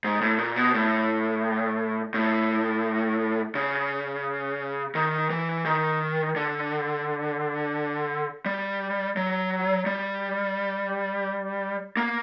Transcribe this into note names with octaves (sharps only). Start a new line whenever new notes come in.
G#2
A2
A#2
B2
A2
A2
C#3
D#3
E3
D#3
D3
G3
F#3
G3
A#3